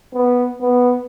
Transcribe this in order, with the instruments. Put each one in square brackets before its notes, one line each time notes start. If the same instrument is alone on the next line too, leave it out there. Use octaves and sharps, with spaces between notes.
[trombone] B3
B3